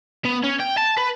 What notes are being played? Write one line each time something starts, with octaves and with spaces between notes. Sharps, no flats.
B3
C#4
G5
A5
B4